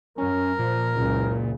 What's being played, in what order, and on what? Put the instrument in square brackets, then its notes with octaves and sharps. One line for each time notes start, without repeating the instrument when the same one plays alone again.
[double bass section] F#2 [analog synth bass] C#4 [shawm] A#4
[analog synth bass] A#2 [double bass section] F3
[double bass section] F#1 C#2 C#3